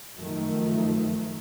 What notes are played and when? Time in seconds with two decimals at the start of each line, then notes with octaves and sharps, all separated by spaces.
0.17 F#2 D#3 F3 A3